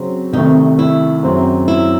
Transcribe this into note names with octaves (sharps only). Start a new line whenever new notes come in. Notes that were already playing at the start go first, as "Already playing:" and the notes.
Already playing: C#3 F#3 C4
C2 C3 D#3 A3 D#4
E4
F#2 C#3 F#3 C4
E4